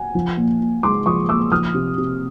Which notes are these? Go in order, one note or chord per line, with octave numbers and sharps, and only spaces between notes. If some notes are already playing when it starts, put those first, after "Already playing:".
Already playing: F#5 G#5
F3
A#2
A#2
G#3 C6 D6
F3 C#6 D#6
A#2 D6 E6
F3 D#6 F6
C3
C3